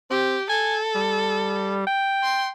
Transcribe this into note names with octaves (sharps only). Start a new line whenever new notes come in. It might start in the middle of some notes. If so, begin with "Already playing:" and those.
C4 G4
A4 G#5
G3
G5
C6